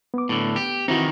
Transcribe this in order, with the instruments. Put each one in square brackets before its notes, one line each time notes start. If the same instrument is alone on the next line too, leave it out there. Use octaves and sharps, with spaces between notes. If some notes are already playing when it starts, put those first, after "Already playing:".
[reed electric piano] B3 D6
[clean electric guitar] A2 D3
G4
[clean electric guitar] D#3 E3 D#4 [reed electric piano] C4 E4 F#4